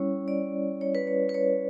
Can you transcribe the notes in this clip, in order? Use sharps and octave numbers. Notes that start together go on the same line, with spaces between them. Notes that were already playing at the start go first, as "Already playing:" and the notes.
Already playing: G3 C#4 E4 C#5
D5
C#5
B4
C#5
B4
C#5